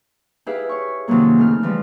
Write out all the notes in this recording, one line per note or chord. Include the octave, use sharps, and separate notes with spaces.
E4 G4 G#4 B4 E5 F5
C#5 C#6
F#2 C3 D#3 F3 F#3 A#3
C#3 A3 D#4 F6
E3 F3 G3